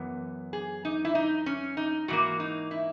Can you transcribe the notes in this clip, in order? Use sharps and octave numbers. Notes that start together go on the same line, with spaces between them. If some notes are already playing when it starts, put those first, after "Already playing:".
Already playing: F#2 E3 B3
G#4
D#4
E4
D#4
C#4
D#4
G#2 E3 A#3 F#4
D#4
E4